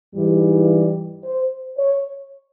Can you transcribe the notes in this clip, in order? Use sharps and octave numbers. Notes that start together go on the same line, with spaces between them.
G#2 E3 G3
C5
C#5